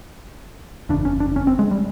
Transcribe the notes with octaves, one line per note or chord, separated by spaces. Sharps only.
F#1 E2 C#3 D4
C#4
D4
C#4
C4
G#3
G3